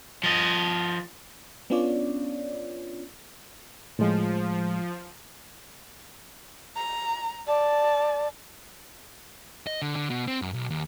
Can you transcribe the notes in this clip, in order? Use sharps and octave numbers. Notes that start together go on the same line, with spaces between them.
F3 D#5
B3 C#4 D4 F4 C#5 D5
A2 F3 G#3
A#5
D5 A5
D#5
D3
D3
B2
C4
F#2
B1
D#2